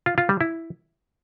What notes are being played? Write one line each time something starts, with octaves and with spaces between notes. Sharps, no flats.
F4
F4
G3
E4